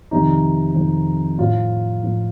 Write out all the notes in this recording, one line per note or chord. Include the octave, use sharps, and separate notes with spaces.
F2 C3 D#3 D#4
F2 C3 D#3
A2 F3 F4
A2 F3